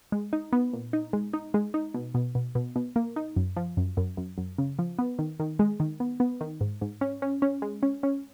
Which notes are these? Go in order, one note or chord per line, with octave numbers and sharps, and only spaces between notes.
G#3
D#4
B3
A#2
D#4
G#3
D#4
G#3
D#4
B2
B2
B2
B2
B2
A#3
D#4
F#2
F3
F#2
F#2
F#2
F#2
C#3
F3
B3
D#3
D#3
G#3
D#3
B3
B3
D#3
G#2
G#2
C#4
C#4
C#4
G#3
C#4
C#4